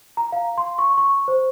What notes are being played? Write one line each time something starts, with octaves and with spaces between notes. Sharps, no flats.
A#5
F5
C6
C#6
C#6
C5